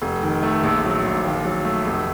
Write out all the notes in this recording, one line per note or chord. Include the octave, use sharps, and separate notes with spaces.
F1
D#3
A3
A#1
F#3
A#1
D#2
F#3
A3
F1